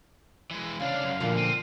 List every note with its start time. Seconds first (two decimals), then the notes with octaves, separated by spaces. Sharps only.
0.51 E3 G#3
0.80 C2 C#3 D4 F5
1.03 F#2
1.20 D2 A#2 D3 F3
1.37 C4 D#7